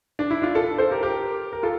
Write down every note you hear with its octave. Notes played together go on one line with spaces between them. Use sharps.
D4
E4
D4 F4
F4 A4
A4 C5
G4 A#4
G4 A#4
A#4
F4 A4